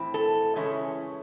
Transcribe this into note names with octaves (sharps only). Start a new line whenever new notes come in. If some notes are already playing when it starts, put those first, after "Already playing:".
Already playing: A2 E3 C4 E4
A4
C#3 E3 G#3 C#4 E4 C#5